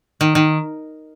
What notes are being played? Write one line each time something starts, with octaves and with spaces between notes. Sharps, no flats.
D#3
D#3